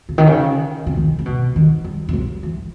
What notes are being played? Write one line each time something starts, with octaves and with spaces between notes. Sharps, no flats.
C#3
D#3
C#3
C#3
D#3
C#3
B2
D#3
G3
E3
G3
E3